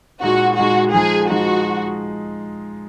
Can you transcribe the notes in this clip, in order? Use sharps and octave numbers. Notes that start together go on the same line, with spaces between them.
A#2 G#3 D#4 F#4
A#2 G#3 D#4 F#4
F3 G#3 D#4 G#4
F3 G#3 D#4 F#4